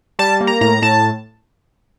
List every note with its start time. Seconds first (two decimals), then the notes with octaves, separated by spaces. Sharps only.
0.19 G3 A5
0.41 A#3
0.47 A#5
0.61 A2 A#5
0.82 A2 A5